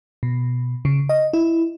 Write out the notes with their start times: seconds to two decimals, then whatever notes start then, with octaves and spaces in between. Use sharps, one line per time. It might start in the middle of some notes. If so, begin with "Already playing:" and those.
0.23 B2
0.85 C#3
1.09 D#5
1.33 E4